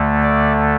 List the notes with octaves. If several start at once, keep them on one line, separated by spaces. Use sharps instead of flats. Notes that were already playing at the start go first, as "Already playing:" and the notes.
Already playing: D2 D3 A3
D5